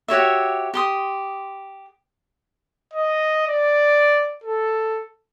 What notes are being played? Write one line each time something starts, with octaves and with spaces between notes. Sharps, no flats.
F#4 G4 C#5 E5
G4 C6 D#6
D#5
D5
A4